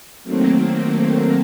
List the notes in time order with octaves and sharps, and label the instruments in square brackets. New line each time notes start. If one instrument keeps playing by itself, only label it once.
[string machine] D#3 F#3 A3 A#3 C4